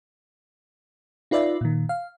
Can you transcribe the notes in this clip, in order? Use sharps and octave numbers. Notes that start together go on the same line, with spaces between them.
D#4 F4 B4 D5 E5
A#2 D#3
F5